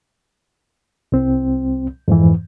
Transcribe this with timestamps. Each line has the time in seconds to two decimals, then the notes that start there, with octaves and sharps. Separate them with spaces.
1.12 C2 C4
2.08 F2 G#2 E3